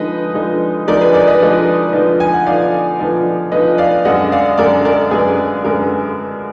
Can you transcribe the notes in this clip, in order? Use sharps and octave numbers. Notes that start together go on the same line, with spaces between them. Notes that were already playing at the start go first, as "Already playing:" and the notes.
Already playing: D3 F3 G#3 D#4 B4 D#5
D3 F3 G#3 D#4
D3 F3 G#3 D#4 A#4 D5
G#4 B4
A#4 D5
B4 D#5
D3 F3 G#3 D#4
D3 F3 B3 D#4
G#5
F#5
D3 F3 B3 D#4 D5 F5
D3 F3 B3 D#4
D3 F3 B3 D#4 B4 D#5
D5 F5
F#2 D3 G#3 D#5 F#5
D5 F5
F#2 D3 G#3 A#4 D5
A#4 D5
F#2 D3 G#3 G#4 B4
F#2 D3 G#3 A#4